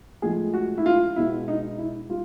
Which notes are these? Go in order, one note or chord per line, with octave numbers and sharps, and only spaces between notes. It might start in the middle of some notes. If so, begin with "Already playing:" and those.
A2 F3 G#3 G#4
F#4
E4
F4
B2 G#3 E4
D#4
E4
G3 F4